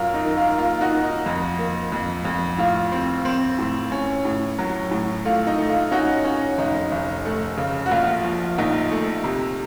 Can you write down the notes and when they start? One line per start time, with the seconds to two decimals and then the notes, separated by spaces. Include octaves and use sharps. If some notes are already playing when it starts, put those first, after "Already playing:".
Already playing: F#2 F4
0.14 D#4
0.25 D#3
0.37 F4
0.58 A#3 F4
0.81 D#4 F#4
0.92 D#3
1.03 D#4
1.26 F2
1.59 A#3
1.92 F2
2.25 F2
2.58 A2 F4
2.92 C4
3.25 C4
3.58 A2
3.92 C#4
4.25 A2
4.59 F#3
4.91 A2
5.25 A3 F4
5.47 D#4
5.58 A3
5.69 F4
5.91 C#4 D#4 F#4
6.25 C#4
6.58 F1 D#4
6.92 F1
7.25 A3
7.57 C#3
7.86 F#4
7.91 A#1 F4
8.24 F3
8.58 A#1 D#4
8.91 A3
9.24 C3